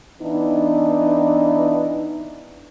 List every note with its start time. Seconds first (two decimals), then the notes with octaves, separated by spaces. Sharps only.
0.21 E3 B3 D4 D#4